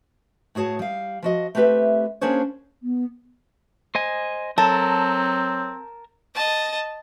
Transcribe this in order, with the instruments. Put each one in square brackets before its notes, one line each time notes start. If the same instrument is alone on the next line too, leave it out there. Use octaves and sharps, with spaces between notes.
[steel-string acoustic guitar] A2 F#4 G#4 C#5 A5
G3 F5
F3 F#4 D#5
A3 C4 G4 B4 E5
A#3 C#4 D4 G#4 C5 C#5
[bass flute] B3
[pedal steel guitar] C5 D#5 G#5
[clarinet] F#3 [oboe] C4 [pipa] A4 [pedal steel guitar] A#4 A5
[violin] D#5 A5